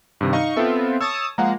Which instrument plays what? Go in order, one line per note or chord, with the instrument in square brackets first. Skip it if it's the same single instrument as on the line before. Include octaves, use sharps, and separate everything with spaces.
[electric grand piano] G2 C3 D#3
[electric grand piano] D#4 D#5 F5 [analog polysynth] C#6
[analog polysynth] B3 C4 F4 [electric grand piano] A4 E5
[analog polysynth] C#5 A5 D#6 [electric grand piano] E6
[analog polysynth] F3 G#3 A#3 [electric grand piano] F5 F#5 A#5